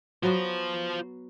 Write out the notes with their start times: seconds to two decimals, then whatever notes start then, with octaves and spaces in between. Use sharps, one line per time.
0.23 F#3 B3 F4 F#4 C5